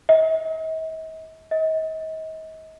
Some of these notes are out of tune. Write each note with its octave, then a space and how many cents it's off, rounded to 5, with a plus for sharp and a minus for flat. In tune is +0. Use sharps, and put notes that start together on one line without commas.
D#5 +45
D#5 +35